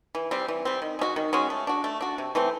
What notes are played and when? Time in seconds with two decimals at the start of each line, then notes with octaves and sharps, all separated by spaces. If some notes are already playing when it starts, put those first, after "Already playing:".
0.15 E3
0.31 G3 C4
0.48 E3
0.65 G3 C4
0.82 D#3
0.99 G#3 C#4 F#4
1.16 D#3
1.33 G#3 C#4 F#4
1.50 A3
1.67 D4 F#4
1.84 A3
2.01 D4 F#4
2.18 C3
2.35 E3 A3 C4